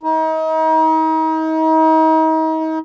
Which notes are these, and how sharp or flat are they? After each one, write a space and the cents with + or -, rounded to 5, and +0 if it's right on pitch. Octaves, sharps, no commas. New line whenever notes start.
D#4 +35